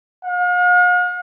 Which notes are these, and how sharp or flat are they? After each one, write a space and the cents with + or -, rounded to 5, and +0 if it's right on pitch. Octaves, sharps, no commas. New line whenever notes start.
F5 +45